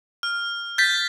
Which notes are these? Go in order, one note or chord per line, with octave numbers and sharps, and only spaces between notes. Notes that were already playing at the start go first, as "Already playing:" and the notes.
F6
G6 A6 B6